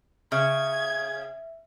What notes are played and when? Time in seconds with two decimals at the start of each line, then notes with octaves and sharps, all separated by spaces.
0.32 C#3 E5 G#6